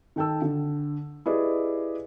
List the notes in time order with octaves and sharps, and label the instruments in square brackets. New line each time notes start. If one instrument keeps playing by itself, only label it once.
[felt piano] D#3 A4 G5 A5 E6
D3
E4 G4 G#4 B4 D5 D#5